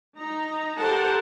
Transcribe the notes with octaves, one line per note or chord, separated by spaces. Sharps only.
D#4 A#5
G4 A4 A#4 C5 F#5 A5